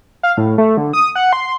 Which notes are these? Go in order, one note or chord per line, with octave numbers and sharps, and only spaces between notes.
F5
A2
A3
D3
D#6
F#5
C6